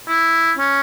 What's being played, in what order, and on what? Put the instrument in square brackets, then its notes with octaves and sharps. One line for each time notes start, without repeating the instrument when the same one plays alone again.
[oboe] E4
C#4